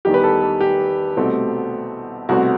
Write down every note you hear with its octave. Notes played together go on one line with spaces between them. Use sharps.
E2 D#3 G3 G4
B4
A4
A4
G4
C2 B2 A3 C4
C2 B2 A3 C4 F#4